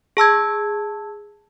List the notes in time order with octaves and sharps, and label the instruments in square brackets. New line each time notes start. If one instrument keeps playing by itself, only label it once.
[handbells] G#4 A5 E6 G#6